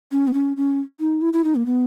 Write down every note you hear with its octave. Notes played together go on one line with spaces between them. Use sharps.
C#4
B3
C#4
C#4
D#4
E4
E4
D#4
A#3
B3